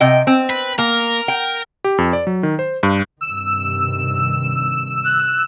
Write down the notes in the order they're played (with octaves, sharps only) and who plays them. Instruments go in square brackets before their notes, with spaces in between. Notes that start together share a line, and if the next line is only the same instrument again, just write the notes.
[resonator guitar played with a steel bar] C3 D#5 G5
C4
[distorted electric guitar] B4
[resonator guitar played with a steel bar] A#3 [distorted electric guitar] A#4
[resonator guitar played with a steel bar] G5
[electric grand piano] G4
F2
D5
F#3
D#3
C5
G2
[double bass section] G2 C3 D#3 [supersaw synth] E6
[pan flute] F#6